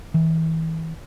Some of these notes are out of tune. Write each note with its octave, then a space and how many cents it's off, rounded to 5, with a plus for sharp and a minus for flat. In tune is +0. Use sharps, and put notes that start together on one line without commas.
E3 -35